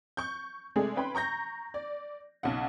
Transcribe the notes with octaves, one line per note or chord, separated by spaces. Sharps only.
C#6 G6
C3 G#3 A3 D4 G#4
C#4 B4 G5 B5 C6
A#5 C#6 G6 A#6
D5
B1 C#3 D#4 F#5